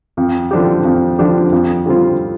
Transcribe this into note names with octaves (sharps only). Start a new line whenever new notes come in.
F2
D3 F3 D4 G4
F2
D3 F3 D4 G4
F2
D3 G3 C4 F4